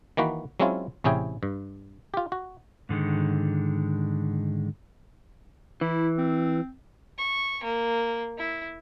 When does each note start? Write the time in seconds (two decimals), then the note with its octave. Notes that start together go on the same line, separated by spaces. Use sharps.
0.17 D#3 E3 A#3 F#4 B4
0.60 F#3 G#3 C4 C#4 E4 F4
1.04 A1 C3 C#4 E4 G#4 G5
1.43 G2
2.14 F4 G4
2.32 F#4
2.89 G#2 D3 D#3 G#3
5.81 E3 E4
6.18 C4
7.18 C#6
7.64 A#3
8.38 E4